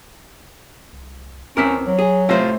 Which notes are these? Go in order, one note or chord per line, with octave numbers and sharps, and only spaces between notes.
C2
D#2 E3 C4 C#4 A#4 D6 F6 B6
F#3
D#1 G#4
A2 C3 F4 C5 A#6